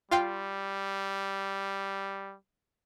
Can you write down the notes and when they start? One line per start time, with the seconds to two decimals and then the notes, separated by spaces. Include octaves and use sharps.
0.11 G3 F4 F5 G5